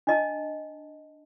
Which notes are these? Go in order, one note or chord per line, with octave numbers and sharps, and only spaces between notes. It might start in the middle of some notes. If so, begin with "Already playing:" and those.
D4 D#5 A5